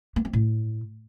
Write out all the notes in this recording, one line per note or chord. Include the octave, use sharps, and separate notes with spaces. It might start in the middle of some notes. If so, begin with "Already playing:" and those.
A#3
C4
A2